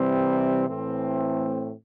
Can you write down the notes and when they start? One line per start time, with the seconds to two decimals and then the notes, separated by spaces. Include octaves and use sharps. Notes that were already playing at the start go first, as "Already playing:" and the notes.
Already playing: C3 E3 G3 C4
0.67 A2 E3 A3 C4